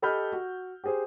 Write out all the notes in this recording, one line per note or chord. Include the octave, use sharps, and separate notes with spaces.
G4 A4 D#5 B5 F6 G6
F#4
G4 G#4 C5